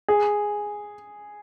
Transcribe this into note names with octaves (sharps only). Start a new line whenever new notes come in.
G#4